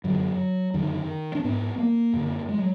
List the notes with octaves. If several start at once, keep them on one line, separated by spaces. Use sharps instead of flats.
F#2 D3 F#3
F#2 D3 D#3
D4
G#2 B3
A#3
F#2 D3
G#3
F#3